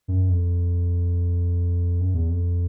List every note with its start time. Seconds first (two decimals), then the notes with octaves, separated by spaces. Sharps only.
0.08 F#2
0.29 F2
2.00 F#2
2.14 E2
2.30 F2